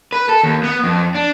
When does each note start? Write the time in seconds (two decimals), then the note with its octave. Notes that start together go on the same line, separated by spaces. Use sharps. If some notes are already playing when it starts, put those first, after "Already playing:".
0.12 B4
0.29 A4
0.43 D#2
0.64 B3
0.84 F2
1.15 D4